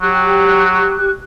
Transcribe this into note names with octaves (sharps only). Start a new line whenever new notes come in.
F#3 G4 F#6